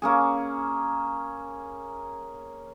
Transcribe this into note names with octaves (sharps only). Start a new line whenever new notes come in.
A#3 C#4 G#4